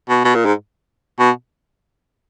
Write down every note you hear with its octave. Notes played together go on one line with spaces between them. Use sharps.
B2
B2
A#2
G#2
B2